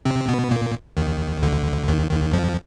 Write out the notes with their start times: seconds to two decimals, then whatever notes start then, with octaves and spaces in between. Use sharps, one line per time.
0.05 C3 C4
0.28 B2 B3
0.51 A#2 A#3
0.97 D#2 D#3
1.43 D2 D3
1.88 D#2 D#3
2.11 D#2 D#3
2.33 F2 F3